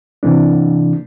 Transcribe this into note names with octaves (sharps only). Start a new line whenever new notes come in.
C3 E3 A#3 D4